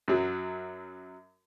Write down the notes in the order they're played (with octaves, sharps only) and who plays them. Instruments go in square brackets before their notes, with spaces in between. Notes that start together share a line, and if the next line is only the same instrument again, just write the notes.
[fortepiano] F#2 F#3